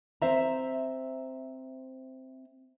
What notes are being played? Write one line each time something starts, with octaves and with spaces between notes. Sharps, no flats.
C4 C5 E5 A#5